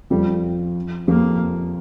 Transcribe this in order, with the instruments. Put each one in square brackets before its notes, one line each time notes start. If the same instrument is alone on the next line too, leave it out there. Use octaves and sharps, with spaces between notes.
[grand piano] F2 F3 [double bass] G3
[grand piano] F2 F3 [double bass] A#3